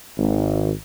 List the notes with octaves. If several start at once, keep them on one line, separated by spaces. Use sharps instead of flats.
G#1